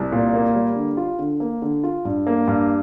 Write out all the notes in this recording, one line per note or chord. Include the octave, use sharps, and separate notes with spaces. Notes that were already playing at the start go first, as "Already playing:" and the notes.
Already playing: C2
A#2
A#3
G3
D3
F4
D3
A#3
D3
F4
G2
A#3
G2